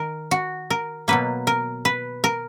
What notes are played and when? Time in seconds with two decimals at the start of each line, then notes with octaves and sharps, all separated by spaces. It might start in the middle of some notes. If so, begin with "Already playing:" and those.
Already playing: D#3 A#4
0.31 F#4
0.70 A#4
1.08 B2 F#3 A#3 B4
1.47 A#4
1.85 B4
2.24 A#4